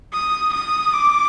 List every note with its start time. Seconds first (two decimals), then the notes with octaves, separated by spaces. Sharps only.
0.13 D#6
0.53 D#6
0.93 D6